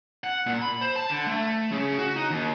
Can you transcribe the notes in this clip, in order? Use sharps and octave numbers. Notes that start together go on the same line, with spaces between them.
F#5
A#2
B5
C5
A5
D3
A3
C#3
F#4
D#4
D#2